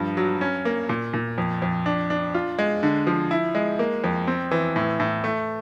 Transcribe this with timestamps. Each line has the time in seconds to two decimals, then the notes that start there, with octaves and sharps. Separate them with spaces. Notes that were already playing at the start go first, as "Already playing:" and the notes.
Already playing: G2 F3
0.17 F#3
0.41 C#4
0.65 A#3
0.89 A#2
1.13 A#2
1.38 F2
1.62 F2
1.86 D4
2.10 D4
2.34 F4
2.59 G#3
2.83 D3
3.07 F3
3.31 E4
3.55 G#3
3.79 A#3
4.04 F2
4.27 C4
4.51 E3
4.76 A2
5.00 A2
5.24 A3